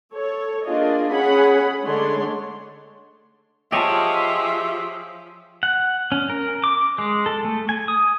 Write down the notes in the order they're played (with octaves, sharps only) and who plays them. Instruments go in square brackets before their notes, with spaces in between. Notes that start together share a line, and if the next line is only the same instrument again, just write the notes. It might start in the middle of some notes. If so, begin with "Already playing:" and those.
[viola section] A4 C#5
A#3 D4 F4 G#4 D#5
C#4 G#4 C#5 F#5 B5
D3 G#3 A3 D4 C#5 C6
[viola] F3 F4 [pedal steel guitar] G4 G#4 C#5 [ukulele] D#5 A5 [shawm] E5
[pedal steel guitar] F#5
C#4
A#4
D6
G#3
A4
A3
G#5
D#6